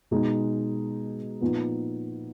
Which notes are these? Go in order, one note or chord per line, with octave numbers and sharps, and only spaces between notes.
B2 G#3 D#4 G#4
A#2 F3 B3 D#4